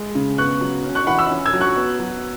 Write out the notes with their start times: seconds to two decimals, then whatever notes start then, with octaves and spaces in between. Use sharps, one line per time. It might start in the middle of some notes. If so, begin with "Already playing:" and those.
Already playing: G#3
0.15 C#3
0.38 B3 C#6 F#6
0.61 F#3
0.84 C#4
0.95 C#6 F#6
1.07 E3 F#5 B5
1.19 B5 E6
1.30 C#4
1.45 E6 G#6
1.53 F#3
1.61 C#6 F#6
1.76 B3
2.00 F#3